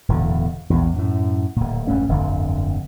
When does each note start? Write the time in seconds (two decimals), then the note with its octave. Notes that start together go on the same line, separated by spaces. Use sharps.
0.08 D1 E2 B2 D3
0.70 A#1 E2
0.96 F#2 A2
1.56 D1 A#2
1.87 E1 G2 A3 C#4
2.08 D1 G1 F2 D3